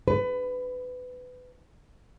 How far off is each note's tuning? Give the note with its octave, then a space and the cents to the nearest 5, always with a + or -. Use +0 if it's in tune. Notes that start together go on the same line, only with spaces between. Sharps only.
B4 +25